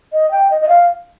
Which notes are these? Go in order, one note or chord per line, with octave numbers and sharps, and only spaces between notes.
D#5
G5
D#5
D#5
F5